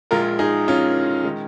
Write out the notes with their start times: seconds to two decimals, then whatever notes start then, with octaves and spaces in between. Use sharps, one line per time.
0.11 A#1 A#2 G#3 F4 A#4
0.39 D#4 G#4
0.68 C#4 F4
1.24 D#3 G#3